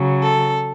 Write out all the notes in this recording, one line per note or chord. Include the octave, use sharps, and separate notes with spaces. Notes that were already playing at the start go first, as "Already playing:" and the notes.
Already playing: C#3 F#3
A4